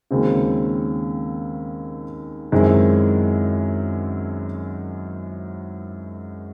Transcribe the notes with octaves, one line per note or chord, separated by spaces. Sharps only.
D#2 C#3 G#3 C4 F#4
F#2 D#3 G#3 C4 E4